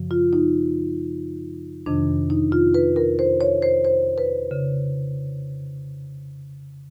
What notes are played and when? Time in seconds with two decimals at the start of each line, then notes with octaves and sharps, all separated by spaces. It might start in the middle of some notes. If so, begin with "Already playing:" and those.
Already playing: F#2 C#3 F3
0.11 F4
0.33 D#4
1.86 F2 C3 D#3 D4
2.30 D#4
2.52 F4
2.74 B4
2.96 A#4
3.19 C5
3.41 C#5
3.62 C5
3.85 C5
4.18 B4
4.51 C#3